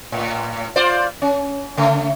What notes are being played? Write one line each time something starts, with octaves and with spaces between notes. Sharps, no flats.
A2
F4 C5 D5
C#4
C#3 A3